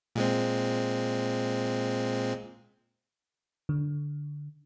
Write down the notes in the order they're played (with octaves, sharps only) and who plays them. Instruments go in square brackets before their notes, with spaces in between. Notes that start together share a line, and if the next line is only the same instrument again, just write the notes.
[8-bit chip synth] A#2 G#3 C4
[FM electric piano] D3